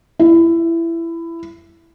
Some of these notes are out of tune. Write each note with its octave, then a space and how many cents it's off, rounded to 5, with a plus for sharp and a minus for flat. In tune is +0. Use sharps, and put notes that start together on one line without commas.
E4 +15